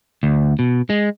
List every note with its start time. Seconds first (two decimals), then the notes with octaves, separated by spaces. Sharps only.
0.23 D2
0.59 B2
0.90 G#3